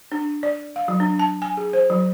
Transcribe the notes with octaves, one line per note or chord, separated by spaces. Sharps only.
D4
D5
F5
F#3
D4
A5
G#5
G#4
C5
F#3